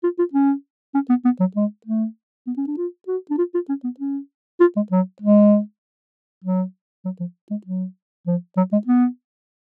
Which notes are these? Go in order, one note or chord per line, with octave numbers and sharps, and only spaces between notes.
F4
F4
C#4
C#4
B3
B3
F#3
G#3
A3
B3
C#4
D4
F4
F#4
D4
F4
F4
C#4
B3
C#4
F4
G#3
F#3
G#3
F#3
F#3
F3
G#3
F#3
F3
F#3
G#3
B3